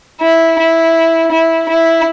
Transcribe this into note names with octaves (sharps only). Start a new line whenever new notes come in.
E4
E4
E4
E4